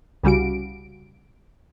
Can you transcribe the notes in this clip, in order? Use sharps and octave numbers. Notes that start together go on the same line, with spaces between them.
C2 C#3 G3 F#4 D7